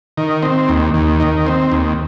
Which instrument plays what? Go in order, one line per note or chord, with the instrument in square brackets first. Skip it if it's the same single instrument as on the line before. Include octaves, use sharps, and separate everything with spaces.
[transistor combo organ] D#3
C4
D#2
D#2
D#3
C4
D#2